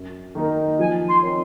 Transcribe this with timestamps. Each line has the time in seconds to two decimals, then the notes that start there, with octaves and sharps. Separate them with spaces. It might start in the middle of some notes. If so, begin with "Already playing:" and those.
Already playing: F#2
0.35 D#3 A#3 D#4 A#4
0.78 F3 G#5
1.08 C6
1.22 C4 D#4 A#4 C#5